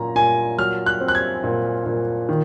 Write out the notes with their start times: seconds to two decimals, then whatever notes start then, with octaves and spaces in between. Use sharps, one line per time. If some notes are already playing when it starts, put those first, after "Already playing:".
Already playing: A#2 F#3 C#4 A#5
0.15 A#2 G#5
0.58 F#3 F6
0.86 F#6
1.01 C4
1.08 F#6
1.15 G#6
1.44 A#2
1.86 A#2
2.29 D#3